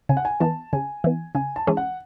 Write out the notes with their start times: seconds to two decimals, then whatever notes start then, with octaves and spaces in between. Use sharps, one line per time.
0.09 C#3 G#5
0.17 F#5
0.25 G#5
0.40 E3 B3 A5
0.73 C#3 G#5
1.04 E3 B3
1.35 C#3 G#5
1.56 A5
1.67 E3 G#3 C#4 G#4
1.77 F#5